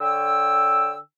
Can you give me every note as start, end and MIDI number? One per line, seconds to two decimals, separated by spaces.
0.01 0.97 50
0.01 0.97 73
0.01 0.97 79
0.01 0.97 88